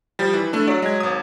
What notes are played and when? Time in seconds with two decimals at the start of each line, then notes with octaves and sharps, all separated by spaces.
0.19 F3 G3
0.34 E3
0.52 A3 D4 E4
0.67 F#3 D5
0.82 G#3 G#6
1.00 G#1 D#6